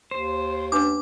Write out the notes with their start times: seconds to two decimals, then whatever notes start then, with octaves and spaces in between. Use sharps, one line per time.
0.11 D#2 C5
0.72 C#4 D4 B4 D6